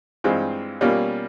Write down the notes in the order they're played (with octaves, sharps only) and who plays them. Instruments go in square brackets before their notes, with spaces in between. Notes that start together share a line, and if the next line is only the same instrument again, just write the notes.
[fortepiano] G2 E3 G#3 C4 F4
B2 G3 A#3 C#4 F4